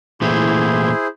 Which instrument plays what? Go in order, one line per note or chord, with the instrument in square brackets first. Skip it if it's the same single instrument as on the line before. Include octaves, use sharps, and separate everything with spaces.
[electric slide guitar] A#2 E3 A3 [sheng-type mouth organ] E4 G#4 C5